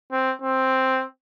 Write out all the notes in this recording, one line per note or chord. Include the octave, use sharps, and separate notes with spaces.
C4
C4